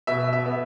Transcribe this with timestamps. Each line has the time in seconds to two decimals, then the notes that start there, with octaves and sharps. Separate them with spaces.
0.07 B2 E5
0.33 E5
0.46 B3